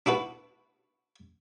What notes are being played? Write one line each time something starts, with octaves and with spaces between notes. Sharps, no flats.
D4 E4 F#4 B4